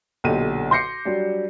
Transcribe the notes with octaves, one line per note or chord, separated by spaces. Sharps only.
B1 A#2 D3 G4 D#7
C6 D6 G6 A#6 C7 C#7
F#3 G3 D4